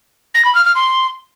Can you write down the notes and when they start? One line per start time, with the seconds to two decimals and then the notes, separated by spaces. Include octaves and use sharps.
0.35 A#6
0.45 B5
0.55 F6
0.65 F6
0.75 C6